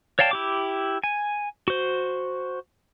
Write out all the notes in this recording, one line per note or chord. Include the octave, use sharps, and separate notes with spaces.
C#5 D5 F5 G5 A5
E4 G4 D6
G#5
F#4 C5